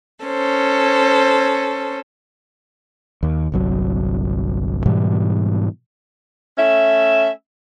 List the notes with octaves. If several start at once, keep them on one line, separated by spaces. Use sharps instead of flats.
C#4 A4 C5
D#2
G1 C2 F#3
G#2 B2 E3 G3
A3 C#4 E5